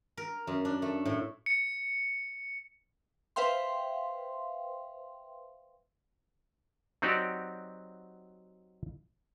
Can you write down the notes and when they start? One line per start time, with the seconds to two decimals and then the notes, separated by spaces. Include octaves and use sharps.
0.17 A#4
0.47 F#2
0.65 D4
0.82 A3
1.05 A2
1.46 C#7
3.36 B4 C5 E5 F5 G5 C6
7.02 F#3 C4 D#4 F#4 G4 D5